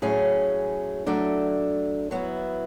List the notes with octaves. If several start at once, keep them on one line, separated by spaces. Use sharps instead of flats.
A2 F#3 C#4 G#4
F#3 A3 D4 A4 D5
F#3 B3 E4